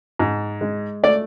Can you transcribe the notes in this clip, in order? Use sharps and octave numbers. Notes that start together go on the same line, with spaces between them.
G#2
G#3
A3 D5